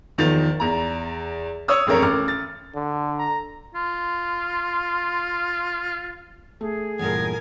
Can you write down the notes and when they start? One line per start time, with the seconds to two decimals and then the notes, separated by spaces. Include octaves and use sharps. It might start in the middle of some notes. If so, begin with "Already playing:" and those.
0.18 E2 D#3 F3 A6 F7
0.60 E2 A#5
1.68 C#5 C#6 D#6 E6
1.87 E1 A1 F2 A4 A#4 C#5
2.02 A1 D6 F6
2.28 A6
2.75 D3
3.19 A#5
3.74 F4 C6
6.61 A3 G#4
6.99 E2 G2 A#2 A#4 G#5